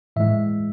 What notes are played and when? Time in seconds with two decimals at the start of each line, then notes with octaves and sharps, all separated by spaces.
0.16 A2 E3 G#3 E5